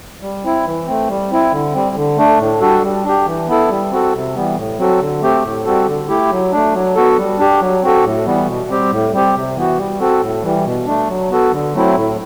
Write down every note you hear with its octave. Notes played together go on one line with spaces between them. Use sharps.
G3
C4 E4
E3
A3 C4
G3
C4 E4
D3
G3 C4
D3
A3 D4
A2
G3 D4 F#4 A4
G3
D4 G4
E3
B3 E4 A4
G3
C4 F#4 A4
C3
E3 G3 B3
A2
F#3 C4 F#4 A4
D3
A3 C4 G4
A2
G3 C4 F#4 A4
D3
A3 E4 G4
F#3
A3 D4
F#3
B3 F#4 A4
G3
D4 G4
F#3
C4 F#4 A4
A2
E3 G3 B3
B2
G3 C4 G4
A2
G3 C4 G4
C3
E3 B3 F#4
G3
C4 F#4 A4
A2
E3 G3
B2
A3 D4
F#3
B3 F#4 A4
D3
F#3 A3 C4 E4
A2